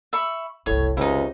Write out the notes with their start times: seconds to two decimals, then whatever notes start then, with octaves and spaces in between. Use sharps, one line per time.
0.13 E5 B5 C#6
0.66 F#1 C2 A2 C#5
0.97 F1 C#2 C3 D#4 E4